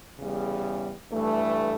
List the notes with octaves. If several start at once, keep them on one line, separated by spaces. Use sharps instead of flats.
E2 C#3 G3
G2 E3 A3